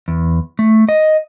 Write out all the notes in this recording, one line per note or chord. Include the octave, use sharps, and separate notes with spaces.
E2
A3
D#5